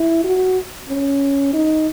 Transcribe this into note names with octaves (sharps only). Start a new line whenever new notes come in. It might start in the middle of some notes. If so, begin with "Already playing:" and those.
Already playing: E4
F#4
C#4
D#4